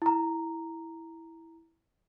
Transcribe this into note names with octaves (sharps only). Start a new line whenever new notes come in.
E4 A#5